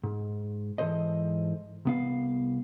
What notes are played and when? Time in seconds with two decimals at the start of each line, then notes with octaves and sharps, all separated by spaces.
0.04 G#2
0.78 G#2 E3 F3 A4 C5 D#5
1.85 C2 B3 F5